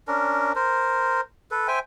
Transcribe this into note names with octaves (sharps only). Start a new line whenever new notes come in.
C#4 D4 A#4
A#4 C5
A4 B4
C5 E5 G5 G#5